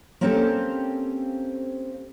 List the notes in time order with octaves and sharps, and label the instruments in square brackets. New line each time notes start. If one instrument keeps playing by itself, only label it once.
[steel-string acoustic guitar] A#3 C4 C#4 G4 A4 C5